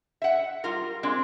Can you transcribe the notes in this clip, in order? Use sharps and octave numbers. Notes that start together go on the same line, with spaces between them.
E5 F#5
G3 F4 A#4
G#3 C4 D4